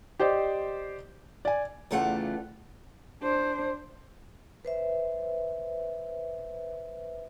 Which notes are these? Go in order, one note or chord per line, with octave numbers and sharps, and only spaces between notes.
G4 C5 D5 D#5
D5 G#5
E2 C#3 A3 F4 G4 F#5
D4 C5
B4 C5 E5